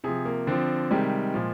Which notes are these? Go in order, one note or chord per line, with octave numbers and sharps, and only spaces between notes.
C3 F3 G#4
A#3
D3 F3 C4
C3 D#3 G3 G#3
A#2 F3